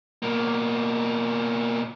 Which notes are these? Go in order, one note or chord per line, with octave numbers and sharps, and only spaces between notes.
B2 A#3